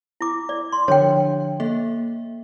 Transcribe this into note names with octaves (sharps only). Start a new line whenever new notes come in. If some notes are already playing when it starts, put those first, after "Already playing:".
E4 D6
D5
C6
D3 F3 D4 C#5 G5
A#3 A4 E5